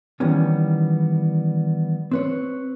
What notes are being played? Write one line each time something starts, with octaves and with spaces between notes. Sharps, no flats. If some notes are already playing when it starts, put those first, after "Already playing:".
D#3 E3 G3 B3 C#4
C4 B4 C#5